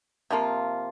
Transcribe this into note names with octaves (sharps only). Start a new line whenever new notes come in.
C3 F3 A#3 F4